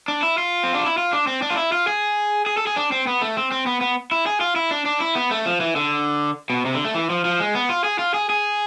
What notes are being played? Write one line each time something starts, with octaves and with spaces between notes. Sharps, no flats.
D4
E4
F4
C4
D4
E4
F4
D4
C4
D4
F4
E4
F4
G#4
G#4
A4
G#4
D4
C4
B3
A3
C4
C4
B3
B3
E4
G#4
F4
E4
D4
D4
E4
B3
A3
F3
E3
D3
B2
C3
D3
A3
E3
F3
F3
G#3
B3
F4
G#4
F4
G#4
G#4